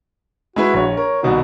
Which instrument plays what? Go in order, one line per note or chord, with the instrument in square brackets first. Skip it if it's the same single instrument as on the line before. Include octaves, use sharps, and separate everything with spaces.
[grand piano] G#3 E4 B4 [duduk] F#4
[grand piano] A#1 C#5
[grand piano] A#4 [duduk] C#5
[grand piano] C2 B2 D#3 [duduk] F#4